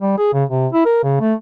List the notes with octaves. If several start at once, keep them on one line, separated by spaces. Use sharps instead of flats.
G3
G#4
C#3
C3
E4
A#4
C#3
A3